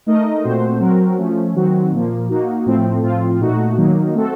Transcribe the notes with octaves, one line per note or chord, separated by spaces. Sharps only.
A3 D#4 A#4 D#5
A#2 A3 C4 F#4 C5
F#3 C4 F#4 A#4
F3 A3 C#4
D#3 F#3 C4 F#4
A#2 F3 A#3
A#3 D#4 F#4
A2 F3 A3 C4
A2 F3 C4 F4
A#2 A3 D#4 F#4
D#3 F#3 A#3 D#4
A3 C4 F#4 A4